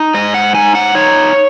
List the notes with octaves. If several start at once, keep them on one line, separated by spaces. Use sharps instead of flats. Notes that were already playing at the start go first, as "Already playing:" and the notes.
Already playing: D#4
G#2 D#5
F#5
D#4 G#5
F#5
D#4 C#5